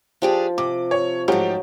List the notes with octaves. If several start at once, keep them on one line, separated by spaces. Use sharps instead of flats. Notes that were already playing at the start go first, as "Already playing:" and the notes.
F3 D4 G4 G#4
C3 D6
C#5
G#2 F3 F#3 A3 G4